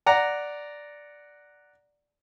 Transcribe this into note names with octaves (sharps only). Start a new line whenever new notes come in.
D5 F#5 A#5